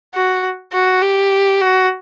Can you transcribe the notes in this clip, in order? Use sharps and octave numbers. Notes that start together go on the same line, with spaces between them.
F#4
F#4
G4
F#4